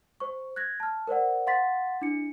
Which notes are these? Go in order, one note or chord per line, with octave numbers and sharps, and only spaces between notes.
C5 C#6
F#6 G#6 A#6
A5 F6
A#4 C5 D5 F#5
F5 F#5 C6 A6 B6
D4 E4 C#7